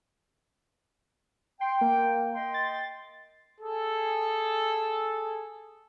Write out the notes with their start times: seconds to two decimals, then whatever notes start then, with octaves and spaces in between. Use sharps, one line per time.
1.61 G5 C6
1.81 A#3
2.35 D#5 G5 C6
2.54 A6
3.61 G#4 A4